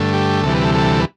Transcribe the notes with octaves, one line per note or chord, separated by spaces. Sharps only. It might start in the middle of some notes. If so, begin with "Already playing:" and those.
Already playing: G2 D3 A3
G4
D2 C3 E3 G3 A4
B4
A4
A4
B4